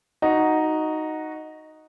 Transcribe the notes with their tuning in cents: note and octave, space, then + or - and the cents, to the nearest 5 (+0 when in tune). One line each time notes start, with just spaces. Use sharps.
D#4 +0 F#4 +0